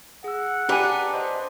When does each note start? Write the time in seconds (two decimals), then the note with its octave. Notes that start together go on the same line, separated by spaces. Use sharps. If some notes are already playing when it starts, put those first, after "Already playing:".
0.24 G#4 F#5 E6
0.69 D4 G4 B4 G#5 A#5 D6 F#6
1.13 C5 D#5 C6